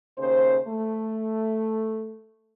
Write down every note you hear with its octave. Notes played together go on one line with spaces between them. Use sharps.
D#2 C#3 C5
A3